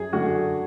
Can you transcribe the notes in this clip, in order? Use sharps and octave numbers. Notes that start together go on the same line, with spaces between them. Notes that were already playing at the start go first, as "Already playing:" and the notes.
Already playing: F#2 G#4
D3 F#3 A3 F#4